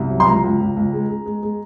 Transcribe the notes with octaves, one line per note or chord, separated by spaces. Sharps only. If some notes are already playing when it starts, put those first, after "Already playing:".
Already playing: C2
F#3
C6
C#2 A#5
C#2
C#2
C#2
G#3
G#3
G#3
G#3